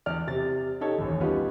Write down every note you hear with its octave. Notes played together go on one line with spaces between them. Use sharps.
E2 D5 F6
C3 A6
D#4 G4 A4 C#5
A1 D#2
G3 B3 C#4 D#4 F4